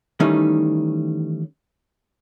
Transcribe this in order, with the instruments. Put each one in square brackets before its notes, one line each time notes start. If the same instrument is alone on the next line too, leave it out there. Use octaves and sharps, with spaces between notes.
[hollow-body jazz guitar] D#3 E3 G3 A3 C#4 D#4